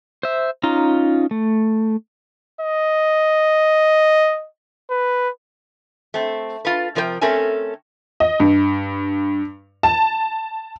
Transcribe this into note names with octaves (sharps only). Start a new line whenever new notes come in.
C5 E5
C#4 D#4 F4 A#5 C6
A3
D#5
B4
A3 C4
F4 A4 B4
C3 F3 A#4 C5 G5
A3 C4 C#4 A4 A#4 G#5
D#5
G2
A5